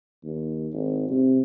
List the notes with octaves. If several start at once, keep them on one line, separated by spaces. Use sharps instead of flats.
D#2
G#1
C3